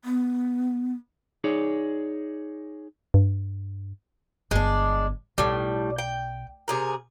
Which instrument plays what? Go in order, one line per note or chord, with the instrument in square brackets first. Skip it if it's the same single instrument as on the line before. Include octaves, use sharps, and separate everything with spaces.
[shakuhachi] B3
[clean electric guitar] D#4 G#4 C#5 D5
[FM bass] G2
[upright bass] G1 B3 [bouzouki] G#3 D4
[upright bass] B1 [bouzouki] A2 G3
[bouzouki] G5
C3 G#4 A#4